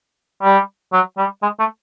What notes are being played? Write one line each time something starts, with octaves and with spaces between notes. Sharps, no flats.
G3
F#3
G3
G#3
A3